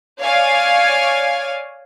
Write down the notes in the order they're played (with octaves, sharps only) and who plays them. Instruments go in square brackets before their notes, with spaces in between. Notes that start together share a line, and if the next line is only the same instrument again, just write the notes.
[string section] C#5 D5 F5 G#5